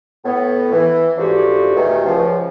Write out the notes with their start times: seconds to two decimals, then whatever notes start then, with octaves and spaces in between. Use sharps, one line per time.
0.25 A2 B3
0.73 E3
1.18 G#2 F3 A3 D4 F#4 G4
1.76 E2 G2 B2 D#3 A3
2.06 C#2 F3